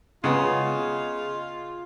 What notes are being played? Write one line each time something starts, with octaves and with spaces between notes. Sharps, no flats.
C#3 B3 F4 G#4 D#5